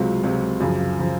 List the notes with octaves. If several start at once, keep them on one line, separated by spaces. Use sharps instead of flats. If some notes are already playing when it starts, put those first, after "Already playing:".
Already playing: C#2 C3 F#3 F4
C#2 C3 F#3
F#2 C#3 F3
C#3 F3